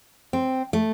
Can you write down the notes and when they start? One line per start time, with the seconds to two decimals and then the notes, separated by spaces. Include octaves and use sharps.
0.33 C4
0.73 A3